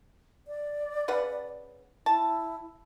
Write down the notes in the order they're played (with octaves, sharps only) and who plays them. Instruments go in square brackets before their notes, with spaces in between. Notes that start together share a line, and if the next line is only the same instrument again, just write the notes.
[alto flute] D5
[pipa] C#3 B4 F#5
[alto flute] E4 [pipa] A5